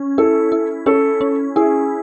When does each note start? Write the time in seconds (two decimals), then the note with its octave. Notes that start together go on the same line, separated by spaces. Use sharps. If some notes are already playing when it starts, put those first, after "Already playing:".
Already playing: C#4
0.18 E4 A4
0.52 E4
0.86 C#4 A4
1.21 C#4
1.56 E4 G#4